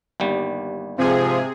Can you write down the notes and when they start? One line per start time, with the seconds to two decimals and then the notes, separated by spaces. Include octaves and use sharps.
0.20 G1 D#2 G3
0.98 G#2 C3 F3 G#4